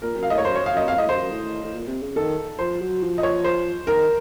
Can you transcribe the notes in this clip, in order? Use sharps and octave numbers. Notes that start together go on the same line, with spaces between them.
A#2 A#4
F#2
F5
A2 D#5
C#5
F#2 C5
C#5
F5
F#2 D#5
F2 F5
A2 D#5
F#2 C5
F#2
A2
A2
A#2
C3
C#3
D#3 A4
F3 C5
F#3
F3
D#5
C#5
C5
D#3 A#4